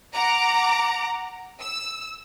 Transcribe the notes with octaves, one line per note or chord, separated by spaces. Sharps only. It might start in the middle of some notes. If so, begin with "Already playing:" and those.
F#5 A#5 D6
E6